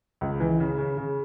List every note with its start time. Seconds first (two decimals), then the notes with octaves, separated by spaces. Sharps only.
0.21 C#2
0.40 E3
0.60 C#3
0.78 C#3
0.97 C#3